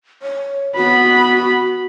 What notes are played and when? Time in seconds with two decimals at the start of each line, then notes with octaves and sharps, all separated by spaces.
0.22 C#5
0.76 B3 F#4 B5